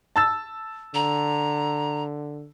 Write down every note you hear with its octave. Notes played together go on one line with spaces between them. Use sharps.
A5 E6 A6
D3 A#5